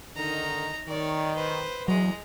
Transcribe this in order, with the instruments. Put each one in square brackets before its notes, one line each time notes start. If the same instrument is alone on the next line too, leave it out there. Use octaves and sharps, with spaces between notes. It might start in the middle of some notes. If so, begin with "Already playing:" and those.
[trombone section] D3 D#3 A#4 [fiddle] D#4 A#5
[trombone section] D#3 [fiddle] C#5 D5
[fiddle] B4 C5
[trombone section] E2 [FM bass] F#3 [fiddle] G#3 A#5